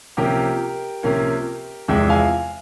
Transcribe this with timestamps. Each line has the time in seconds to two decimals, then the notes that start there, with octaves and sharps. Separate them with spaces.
0.17 C3 F3 A#3 C#4 G4 A#4
1.03 C3 F3 A#3 C#4
1.88 E2 C3 F3 G#3 E5 G5
2.09 F5 G#5